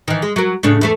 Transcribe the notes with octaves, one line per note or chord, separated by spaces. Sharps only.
D#3 E3
G#3
F#3 A#4
A2 C#3 D4
E2 A3 A4